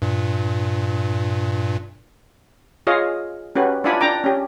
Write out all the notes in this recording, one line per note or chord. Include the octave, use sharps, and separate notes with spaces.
G2 A#2
F4 G#4 C#5 D#5 F5
C#4 F#4 G4 B4
D4 E4 F4 D5 G#5 B5
D4 G5 A#5 D6
C#4 G4